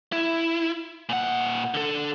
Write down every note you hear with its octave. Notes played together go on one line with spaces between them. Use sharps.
E4
A#2 F#5
D3 A4